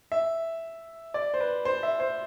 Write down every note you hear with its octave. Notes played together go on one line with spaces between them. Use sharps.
E5
D5
C5
B4
C5
E5
C5